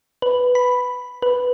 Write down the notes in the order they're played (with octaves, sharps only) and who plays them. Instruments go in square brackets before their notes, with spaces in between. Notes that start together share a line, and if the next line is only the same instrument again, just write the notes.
[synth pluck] B4
B5
B4